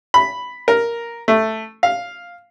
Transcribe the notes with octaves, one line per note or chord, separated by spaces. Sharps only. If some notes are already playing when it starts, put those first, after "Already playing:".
B5
A#4
A3
F5